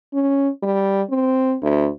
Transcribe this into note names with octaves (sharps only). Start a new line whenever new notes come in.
C#4
G3
C4
D2